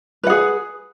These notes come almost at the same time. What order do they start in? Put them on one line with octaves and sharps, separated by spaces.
B4 F#5 G#4